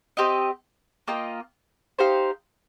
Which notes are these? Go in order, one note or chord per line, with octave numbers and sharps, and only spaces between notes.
C4 G4 D#5
A#3 F4 D#5 G5
D#4 G4 C5 F5